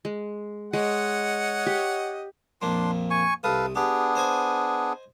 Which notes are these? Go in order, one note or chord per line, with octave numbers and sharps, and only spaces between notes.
G#3
G#3 C#5 D#5 F#5
G4
A#1 F2 A#3 D4 C6
G#5 C#6
C2 A4 B4 F5 D#6
B3 D4 G4 G#4
C5 D#5 G#5